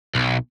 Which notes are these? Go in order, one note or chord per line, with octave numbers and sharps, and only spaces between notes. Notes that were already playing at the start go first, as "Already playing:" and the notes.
B1